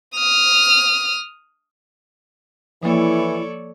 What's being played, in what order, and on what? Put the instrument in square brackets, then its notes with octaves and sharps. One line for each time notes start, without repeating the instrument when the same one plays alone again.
[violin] D#6 F6
[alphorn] E3 [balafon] F3 A#3 [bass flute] E4 [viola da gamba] A4 C#5 D5